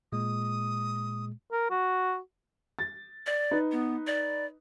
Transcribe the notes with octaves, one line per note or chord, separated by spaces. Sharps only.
A#2 G#3 D#6
A#4
F#4
A6
D5
D#4 B4
B3
D5